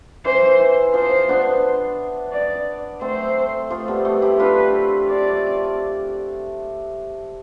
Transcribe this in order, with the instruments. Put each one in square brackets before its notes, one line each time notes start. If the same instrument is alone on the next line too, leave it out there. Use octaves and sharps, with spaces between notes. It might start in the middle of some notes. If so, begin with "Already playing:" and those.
[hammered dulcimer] E3 [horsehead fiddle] C5
[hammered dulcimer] E3
[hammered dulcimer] F3 [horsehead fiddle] C5
[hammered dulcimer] B3 D4
[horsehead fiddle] D5
[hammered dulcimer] A3 C4 [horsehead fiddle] C5
[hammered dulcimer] F3 A3
G3 B3
A3 C4
E4 G4
[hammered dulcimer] D4 F4 [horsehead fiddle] B4
[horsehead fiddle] D5